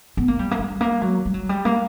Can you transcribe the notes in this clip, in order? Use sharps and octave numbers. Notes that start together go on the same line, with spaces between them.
B3
A#3
G3
A#3
G3
A#3
F#3
G3
F#3
G3
A#3